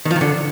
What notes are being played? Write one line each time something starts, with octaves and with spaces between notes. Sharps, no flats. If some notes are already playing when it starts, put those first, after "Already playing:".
D#3
F3
D#3
D3